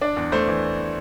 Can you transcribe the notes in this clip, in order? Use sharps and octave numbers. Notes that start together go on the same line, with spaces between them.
D4 D5
E2
A3 C5
E3